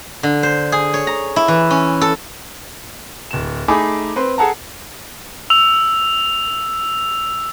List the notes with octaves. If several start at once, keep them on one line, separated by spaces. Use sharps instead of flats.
D3
C5
G#4
C#5
A#5
E4
E3
C#4
A4
D1 E7
A3 D#4 G#4 G#5 B5 D6
C4 B4 C6
G#4 A4 F#5 A5 A#5
E6 F7